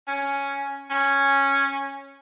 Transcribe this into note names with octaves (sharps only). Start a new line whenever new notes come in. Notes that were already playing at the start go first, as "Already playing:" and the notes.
C#4
C#4